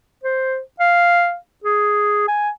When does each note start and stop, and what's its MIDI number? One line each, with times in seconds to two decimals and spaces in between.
0.24 0.59 72
0.80 1.35 77
1.64 2.26 68
2.28 2.50 80